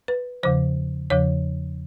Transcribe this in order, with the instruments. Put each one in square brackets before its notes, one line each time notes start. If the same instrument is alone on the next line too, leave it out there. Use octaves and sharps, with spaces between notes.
[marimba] B4
E2 C#3 F3 C5
E2 C#3 F3 C#5